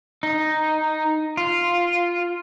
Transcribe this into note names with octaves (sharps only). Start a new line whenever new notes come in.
D#4
F4